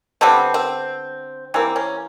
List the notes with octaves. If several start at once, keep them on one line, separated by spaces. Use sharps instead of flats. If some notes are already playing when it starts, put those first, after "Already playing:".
D3 G3 B3 C4
C4
E3 G3 A#3 C4
C#4